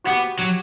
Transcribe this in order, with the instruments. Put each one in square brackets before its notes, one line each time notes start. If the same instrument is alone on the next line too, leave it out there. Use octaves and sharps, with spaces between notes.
[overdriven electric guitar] B3 [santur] F#4 G4
[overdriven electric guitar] F#3